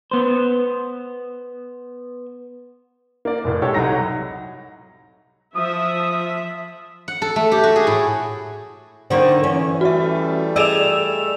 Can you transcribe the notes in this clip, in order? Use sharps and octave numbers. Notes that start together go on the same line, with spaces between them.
B3 C5
A#3 D5
F1 A2
G#3 G4 A4 C#5
C2 F#3 D#4 A#5 A#6
F3 E5 D#6
F#5
A4
A3
G4
F#4
G#4
A2
D3 D#3 A#3 C5
E3 C#4
G3 A3 F#4 E5
G#4 D5 D#5 E6 E7 F7